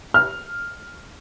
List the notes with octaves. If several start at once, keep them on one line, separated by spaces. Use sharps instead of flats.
F6